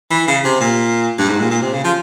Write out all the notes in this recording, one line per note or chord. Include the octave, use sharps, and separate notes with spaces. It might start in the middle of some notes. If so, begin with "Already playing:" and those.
E3
C#3
C3
A#2
G2
G#2
A#2
A#2
C3
C#3
F3